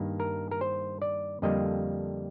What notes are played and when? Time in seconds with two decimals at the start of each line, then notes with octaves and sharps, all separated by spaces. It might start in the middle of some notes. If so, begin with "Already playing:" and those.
Already playing: G2 D#3 A#3
0.20 A#4
0.51 A#4
0.61 C5
1.02 D5
1.42 F2 D3 G3 A#3 D#5